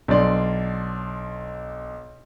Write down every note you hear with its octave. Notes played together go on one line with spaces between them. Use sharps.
B1 D4 D5 C6